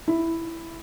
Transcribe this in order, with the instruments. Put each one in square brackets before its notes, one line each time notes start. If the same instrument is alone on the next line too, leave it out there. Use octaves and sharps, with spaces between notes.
[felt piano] E4